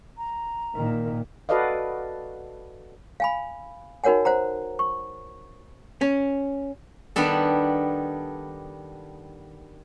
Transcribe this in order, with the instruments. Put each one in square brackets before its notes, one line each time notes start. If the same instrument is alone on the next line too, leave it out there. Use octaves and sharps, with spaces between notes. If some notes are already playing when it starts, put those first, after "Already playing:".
[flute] A#5
[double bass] A#2 D#3
[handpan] F#4 A4 B4 D5 D#5 F5
[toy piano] F5 G#5 B5
D#4 F#4 A#4 C#5 F#5 G#5
C5 F#5 A#5
C#6
[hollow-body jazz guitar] C#4
[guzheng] D#3 G3 B3 D4 A4